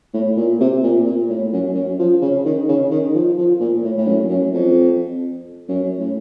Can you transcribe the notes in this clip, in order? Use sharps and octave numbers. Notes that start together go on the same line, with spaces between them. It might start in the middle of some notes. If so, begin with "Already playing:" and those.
A2
A#2
C3
A#2
A#2
A2
F#2
F#2
F3
C#3
D#3
C#3
D#3
F3
F3
A#2
A2
A2
F#2
F#2
F2
F#2
A2